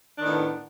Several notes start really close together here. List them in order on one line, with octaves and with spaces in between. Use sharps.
D4 D#3 A2 B3